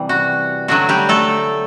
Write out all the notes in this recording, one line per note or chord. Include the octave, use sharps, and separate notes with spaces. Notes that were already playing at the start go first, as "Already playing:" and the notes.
Already playing: C3 E3 G3
F#4
D3 F#3 A3 D4 F#4
G3 G4
A3 A4